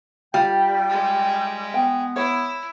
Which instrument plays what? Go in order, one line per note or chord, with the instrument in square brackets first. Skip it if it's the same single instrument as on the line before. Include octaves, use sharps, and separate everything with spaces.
[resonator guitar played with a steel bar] G3 [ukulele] F4 [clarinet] G5
[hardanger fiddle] G#3
[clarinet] B3 [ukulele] G5
[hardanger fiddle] E4 [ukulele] C#5